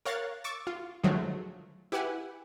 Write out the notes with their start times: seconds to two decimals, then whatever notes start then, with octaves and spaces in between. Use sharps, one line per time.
0.05 A#4 C#5 F5 F#6 A6
0.44 C#6 D6 E6 A6
0.67 F4
1.04 D3 D#3 F3 F#3 G#3 A3
1.92 E4 G4 B4 F#5 G#5